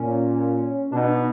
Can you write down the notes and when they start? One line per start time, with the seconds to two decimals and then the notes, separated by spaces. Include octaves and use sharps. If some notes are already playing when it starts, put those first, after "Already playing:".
Already playing: A#2 C#4
0.92 B2 D4
0.99 D#4
1.06 D4
1.13 D#4